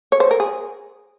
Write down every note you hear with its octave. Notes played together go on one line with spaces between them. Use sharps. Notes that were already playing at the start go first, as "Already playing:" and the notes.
C#5
C5
A#4
G#4